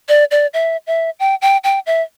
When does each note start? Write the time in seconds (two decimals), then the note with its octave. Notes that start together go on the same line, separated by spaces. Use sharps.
0.09 D5
0.31 D5
0.54 E5
0.87 E5
1.20 G5
1.42 G5
1.64 G5
1.86 E5